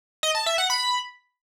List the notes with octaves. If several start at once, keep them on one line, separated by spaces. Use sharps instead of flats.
D#5
A5
E5
F#5
B5